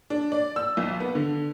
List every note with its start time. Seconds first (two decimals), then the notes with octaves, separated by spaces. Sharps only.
0.10 D4
0.32 D5
0.56 E6
0.77 B1
1.00 B3
1.15 D3